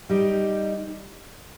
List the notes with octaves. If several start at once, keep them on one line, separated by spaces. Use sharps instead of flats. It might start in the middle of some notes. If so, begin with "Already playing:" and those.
G3 D#4 G4